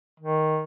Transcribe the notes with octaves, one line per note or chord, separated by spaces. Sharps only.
D#3